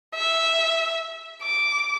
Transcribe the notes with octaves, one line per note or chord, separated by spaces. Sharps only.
E5
D6